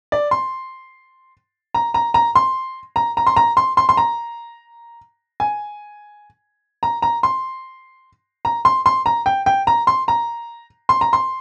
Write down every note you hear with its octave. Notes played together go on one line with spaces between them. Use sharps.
D5
C6
A#5
A#5
A#5
C6
A#5
A#5
C6
A#5
C6
C6
C6
A#5
G#5
A#5
A#5
C6
A#5
C6
C6
A#5
G5
G5
A#5
C6
A#5
C6
A#5
C6